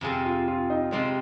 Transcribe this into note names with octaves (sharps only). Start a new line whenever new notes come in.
F2 C3 F3 C4 G#4
F4
F4
D#4
F2 C3 F3 G#3 C4